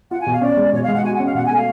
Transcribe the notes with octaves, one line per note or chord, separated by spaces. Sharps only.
F4 F#5
G#5
B2
F5
C#4 D5
G#3
B2 C#5
F5
G#3
F#5
F#4 G#5
F#5
C#4
F5
B2 F#5
G#5
A3
F5